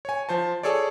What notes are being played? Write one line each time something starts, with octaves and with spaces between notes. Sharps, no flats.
C#5 G#5
F3 C5 A5
G#4 A4 C#5 D5